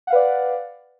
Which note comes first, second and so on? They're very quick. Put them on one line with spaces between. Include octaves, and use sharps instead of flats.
F#5 F5 B4 D5